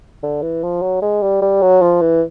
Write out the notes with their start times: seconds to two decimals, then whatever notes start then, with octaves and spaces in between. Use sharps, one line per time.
0.23 D3
0.43 E3
0.63 F3
0.82 F#3
1.02 G#3
1.22 G3
1.42 G3
1.62 F#3
1.82 F3
2.01 E3